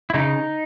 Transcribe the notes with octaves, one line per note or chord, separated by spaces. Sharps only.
E4
C#3 D#4